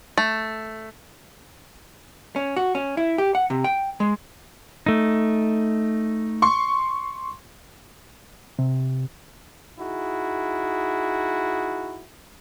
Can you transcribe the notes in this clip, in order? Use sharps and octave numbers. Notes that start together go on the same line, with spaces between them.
A3
C#4
F#4
C#4
E4
G4
F#5
C3
G5
G#3
A3 D#4
C6 C#6
C3
D#4 E4 F#4 G#4